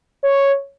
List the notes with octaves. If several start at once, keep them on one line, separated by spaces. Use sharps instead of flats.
C#5